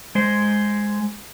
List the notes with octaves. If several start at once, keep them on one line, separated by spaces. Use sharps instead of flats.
G#3 C5